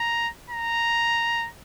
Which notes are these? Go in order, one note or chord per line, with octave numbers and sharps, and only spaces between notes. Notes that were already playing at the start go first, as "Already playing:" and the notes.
Already playing: A#5
A#5